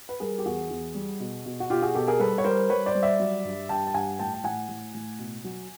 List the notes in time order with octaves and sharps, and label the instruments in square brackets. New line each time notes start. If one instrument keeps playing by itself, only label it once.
[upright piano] B4
G3 G#4 A#4
G4
E2 F#4 G#4
E2
G3
B2
B2
F#4
B2 F4 G4
F#4 G#4
B2 G4 A4
G#4 A#4
G3 A4 B4
C#5
G3 A#4 C5
G3 B4 C#5
C5 D5
G3
D5 E5
F#3
G2
G2 G5 A5
A5
G2 F#5 G#5
A2 G5 A5
A5
A2 F#5 G#5
A2
A2
B2
F#3